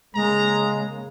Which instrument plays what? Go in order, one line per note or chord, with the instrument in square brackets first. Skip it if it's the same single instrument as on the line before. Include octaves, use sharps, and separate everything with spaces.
[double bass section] C#3 A#3 [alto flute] G#3 [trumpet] A#5